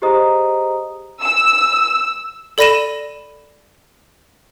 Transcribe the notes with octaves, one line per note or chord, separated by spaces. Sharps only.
G4 G#4 C5 D#5 A#5 D#6
E6
A4 D5 B5 A#6 D#7 E7